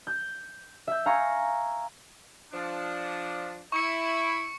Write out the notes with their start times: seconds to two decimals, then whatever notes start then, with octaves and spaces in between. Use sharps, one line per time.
0.07 G6
0.87 E5 G6
1.06 F5 G#5 A#5 C#6
2.53 F3 D4
3.72 E4 C#6 C#7